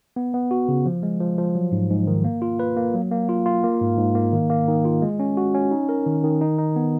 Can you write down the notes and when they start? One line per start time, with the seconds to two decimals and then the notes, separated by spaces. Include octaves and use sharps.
0.16 B3
0.34 B3
0.51 F#4
0.68 C#3
0.86 F3
1.03 G#3
1.20 F3
1.38 F3
1.55 F#3
1.72 G#2
1.90 G#2
2.07 D#3
2.24 A#3
2.42 F4
2.59 B4
2.76 A#3
2.94 F#3
3.11 A#3
3.29 F4
3.46 F4
3.64 A#3
3.81 G#2
3.98 G#2
4.15 A#3
4.33 D#3
4.50 A#3
4.68 D#3
4.85 F4
5.02 G#3
5.19 C#4
5.37 F#4
5.55 C#4
5.71 D#4
5.89 A#4
6.06 D#3
6.24 D#3
6.41 D#4
6.58 D#4
6.76 B3